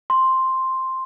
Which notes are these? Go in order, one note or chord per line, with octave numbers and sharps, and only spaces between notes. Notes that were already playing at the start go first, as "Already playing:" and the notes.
C6